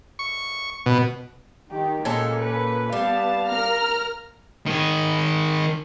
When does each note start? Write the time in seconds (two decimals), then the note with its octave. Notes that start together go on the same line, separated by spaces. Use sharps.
0.19 C#6
0.86 B2
1.71 D#3 G4
2.05 A#2 G#3 A#3 C#4 A4
2.39 B4
2.93 G3 B3 F5 A5
3.48 A#4 A#5 F6
4.66 D#3 G#4